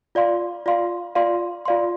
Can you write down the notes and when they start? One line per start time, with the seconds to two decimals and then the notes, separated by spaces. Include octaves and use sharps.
0.15 F4 D5 F5 C6
0.66 F4 D5 F5 C6
1.15 F4 D5 F5 C6
1.65 F4 D5 F5 C6